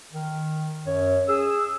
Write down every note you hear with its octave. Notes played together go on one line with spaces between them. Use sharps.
D#3
F#2 C#5
G#4 E6